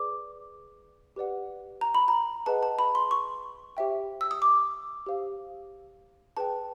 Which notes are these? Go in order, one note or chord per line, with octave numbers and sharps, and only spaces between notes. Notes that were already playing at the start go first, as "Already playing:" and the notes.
Already playing: G#4 B4 D5 D6
G4 B4 D5 F#5
A#5
B5
A#5
G#4 B4 D#5 F#5 A5
A5
B5
C6
C#6
G4 C5 E5 G5
E6
D#6
D6
G4 C5 F5
G#4 B4 D5 G5 A5